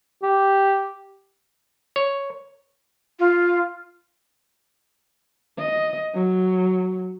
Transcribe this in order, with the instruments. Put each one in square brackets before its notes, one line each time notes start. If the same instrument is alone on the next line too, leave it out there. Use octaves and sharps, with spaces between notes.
[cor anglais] G4
[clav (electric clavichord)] C#5
[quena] F4
[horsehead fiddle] D#5
F#3